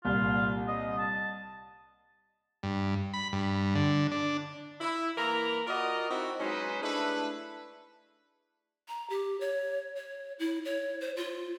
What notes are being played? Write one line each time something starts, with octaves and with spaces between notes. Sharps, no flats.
C2 A#2 F4
D#5
A5
G2
B5
G2
D3
D4
E4
E3 A#3 A#4 A#5 B5
F4 F#4 A#4 D5 D#5
C4 D#4 E4 F#4
F#3 G#3 C#4 D#4 B4 C5
A3 D4 E4 G#4 B4
A#5
G4
C#5
C#5
E4
C#5
C5
F4